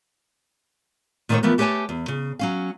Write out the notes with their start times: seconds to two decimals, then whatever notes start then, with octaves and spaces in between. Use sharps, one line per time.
1.29 A#2 D#3 A3 A#3 C5 C#5
1.43 E3 F3 A3 B3 A#4
1.58 A3 G4 B4 C#5 G#5 A5
1.89 E2
2.08 C#3
2.39 F#3 C#4 F5